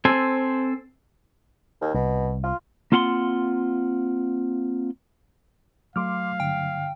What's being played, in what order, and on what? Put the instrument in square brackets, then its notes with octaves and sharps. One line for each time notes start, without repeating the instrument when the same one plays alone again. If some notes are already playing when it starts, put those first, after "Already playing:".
[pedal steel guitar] C4 A4 C5 G#5
[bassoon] D#2
[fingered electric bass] C2 [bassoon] B2
[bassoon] F4
[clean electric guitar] A#3 C4 F4 F#5 B5 C6
[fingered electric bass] F#3 A3 [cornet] F5 [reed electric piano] C6 D6 F6
[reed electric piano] G2 D3 [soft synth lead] G5